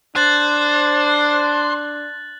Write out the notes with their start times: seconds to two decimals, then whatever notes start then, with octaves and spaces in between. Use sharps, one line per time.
0.16 D4 C5 F#6 A6 F#7